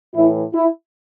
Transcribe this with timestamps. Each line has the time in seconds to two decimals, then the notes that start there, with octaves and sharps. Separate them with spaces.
0.15 A2 E3 E4
0.54 E4